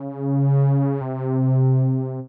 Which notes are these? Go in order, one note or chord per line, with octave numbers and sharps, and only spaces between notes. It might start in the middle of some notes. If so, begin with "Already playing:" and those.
Already playing: C#3
C3